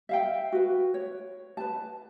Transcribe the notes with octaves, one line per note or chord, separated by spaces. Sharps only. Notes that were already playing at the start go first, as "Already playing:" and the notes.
E5 F5 G5
F#4 B4
C#5
B4 A5